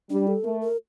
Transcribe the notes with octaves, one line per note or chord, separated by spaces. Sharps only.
G3 D4
A4
A3 A#4
A#4